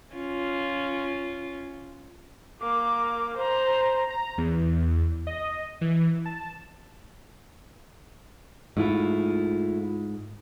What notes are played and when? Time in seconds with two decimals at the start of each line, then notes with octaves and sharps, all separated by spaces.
0.13 C#4 F4
2.61 A#3 D6
3.37 C5 A#5
4.10 A#5
4.38 E2
5.27 D#5
5.81 E3
6.26 A5
8.77 G#2 A3 E4 F4